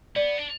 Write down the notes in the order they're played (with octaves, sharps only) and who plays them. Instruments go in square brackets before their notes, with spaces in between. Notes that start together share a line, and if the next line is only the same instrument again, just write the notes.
[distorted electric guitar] B3 [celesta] D5
[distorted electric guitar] D4